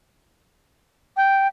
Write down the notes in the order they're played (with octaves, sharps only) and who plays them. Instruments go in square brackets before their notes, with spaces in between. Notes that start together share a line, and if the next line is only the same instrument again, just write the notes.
[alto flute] G5